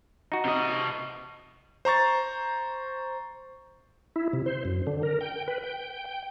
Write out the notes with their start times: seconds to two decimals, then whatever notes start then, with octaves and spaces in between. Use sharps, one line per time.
0.32 D#4 F#4
0.45 C3 D#5
1.85 C5 A#5 C#6 A6
4.16 E4
4.33 C3
4.46 C5
4.65 F#2
4.87 D3
5.03 A#4
5.21 G5
5.48 B4
5.64 G5
6.05 G5